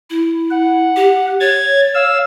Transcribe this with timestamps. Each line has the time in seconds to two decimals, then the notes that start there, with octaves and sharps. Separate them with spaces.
0.10 E4
0.51 F#5
0.96 G4
1.40 C#5 G#6 A6
1.95 F5 E6